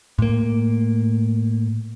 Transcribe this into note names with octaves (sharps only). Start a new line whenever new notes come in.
A2 A#3